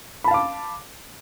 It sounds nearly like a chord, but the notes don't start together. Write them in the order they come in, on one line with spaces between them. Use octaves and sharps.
B5 A5 F5 D6